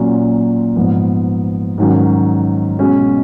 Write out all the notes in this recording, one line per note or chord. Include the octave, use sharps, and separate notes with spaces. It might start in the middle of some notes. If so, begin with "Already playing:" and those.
Already playing: A#2 F#3 C#4
G#2 F3 B3
G#2 D#3 F#3 C#4
B2 G#3 C#4